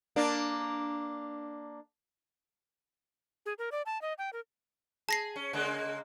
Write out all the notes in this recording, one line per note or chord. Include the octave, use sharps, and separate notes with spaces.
A#3 D4
G#4
A#4
D5
A5
D#5
G5
A#4
G#4 A5 A#6 C7
C#4
C#3 G#3 A#3